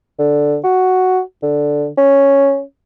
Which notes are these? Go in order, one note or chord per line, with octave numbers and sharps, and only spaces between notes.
D3
F#4
D3
C#4